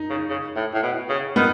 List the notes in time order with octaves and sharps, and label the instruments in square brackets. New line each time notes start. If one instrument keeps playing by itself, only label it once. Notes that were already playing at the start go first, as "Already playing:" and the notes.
Already playing: [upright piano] D#4
[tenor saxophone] C#3
C#3
A2
A2
B2
C#3
[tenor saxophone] D#3 [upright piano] B3